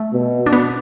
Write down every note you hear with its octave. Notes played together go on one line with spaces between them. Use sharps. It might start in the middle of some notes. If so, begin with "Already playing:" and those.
Already playing: A3
B2
D4
B3